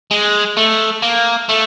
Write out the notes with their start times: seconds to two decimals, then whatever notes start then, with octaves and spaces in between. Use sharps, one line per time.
0.11 G#3
0.57 A3
1.02 A#3
1.49 A3